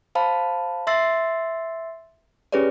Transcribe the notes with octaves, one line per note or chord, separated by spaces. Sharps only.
C5 F5 A5 B5
E5 C6 E6 A6 C7
C#4 G4 G#4 B4 C#5 D5